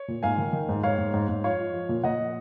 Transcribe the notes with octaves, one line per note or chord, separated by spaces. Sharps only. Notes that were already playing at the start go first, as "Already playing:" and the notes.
Already playing: C#5
A#2
G#2 F5 G#5
D#3
D#3
G#2
G#2 C#5 F5
G#2
G#2
G#2
F3 C#5 F5
F3
F3
A#2
A#2 D#5 F#5
F3